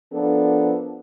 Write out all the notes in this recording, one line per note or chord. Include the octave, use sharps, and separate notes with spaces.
F3 B3 D4 A4 A#4